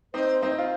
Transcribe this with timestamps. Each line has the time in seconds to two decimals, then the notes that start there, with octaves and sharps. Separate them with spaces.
0.14 C4 D#4 C5
0.42 C4 D#4
0.58 F4